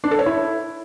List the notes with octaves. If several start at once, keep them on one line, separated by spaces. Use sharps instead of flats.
D4
A4
C#5
E4